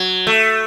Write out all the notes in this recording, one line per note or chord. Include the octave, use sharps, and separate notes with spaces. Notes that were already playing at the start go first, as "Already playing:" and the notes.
Already playing: F#3
A3